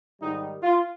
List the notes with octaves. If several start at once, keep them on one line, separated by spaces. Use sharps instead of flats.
G#2 D#3 G3 D#4
F4